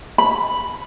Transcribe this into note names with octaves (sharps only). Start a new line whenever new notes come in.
B5